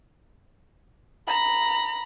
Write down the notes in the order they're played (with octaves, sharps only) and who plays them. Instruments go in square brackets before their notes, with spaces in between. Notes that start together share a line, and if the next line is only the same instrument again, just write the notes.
[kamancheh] A#5 B5